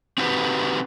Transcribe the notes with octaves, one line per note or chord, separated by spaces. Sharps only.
C4 D#4 F#4 G4 B4